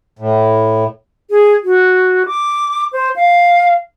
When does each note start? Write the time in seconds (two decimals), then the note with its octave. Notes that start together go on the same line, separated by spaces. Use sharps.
0.19 A2
1.30 G#4
1.64 F#4
2.26 D6
2.93 C5
3.16 F5